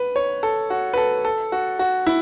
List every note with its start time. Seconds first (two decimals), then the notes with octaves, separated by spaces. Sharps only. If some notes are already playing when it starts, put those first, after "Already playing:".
Already playing: B4
0.16 C#5
0.43 A4
0.70 F#4
0.94 B4
0.98 A4
1.25 A4
1.52 F#4
1.79 F#4
2.07 E4